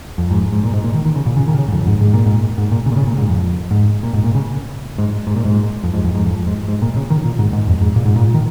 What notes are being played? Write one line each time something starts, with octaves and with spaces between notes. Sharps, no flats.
F2
G#2
G#2
A#2
G#2
A#2
D#3
D#3
C#3
A#2
C#3
D#3
C#3
G#2
F2
G#2
G#2
A#2
G#2
G#2
A#2
C#3
A#2
C#3
A#2
G#2
F2
G#2
A#2
G#2
A#2
C#3
G#2
G#2
A#2
G#2
F2
G#2
F2
G#2
F2
G#2
G#2
A#2
C#3
D#3
A#2
G#2
G#2
F2
G#2
A#2
G#2
A#2
D#3